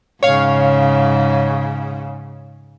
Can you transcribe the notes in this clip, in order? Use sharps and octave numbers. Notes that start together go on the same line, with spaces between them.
G#2 C#3 C#5 F5